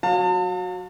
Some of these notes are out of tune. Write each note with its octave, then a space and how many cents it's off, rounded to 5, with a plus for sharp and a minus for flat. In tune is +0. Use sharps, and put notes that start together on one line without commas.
F#3 -15 F5 +35 A5 +40